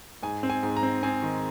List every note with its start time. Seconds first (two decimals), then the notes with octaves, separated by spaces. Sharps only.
0.23 G#2 G#5
0.43 C4
0.50 G#5
0.63 G#2
0.77 A#5
0.83 C4
1.03 C4 G#5
1.23 D#3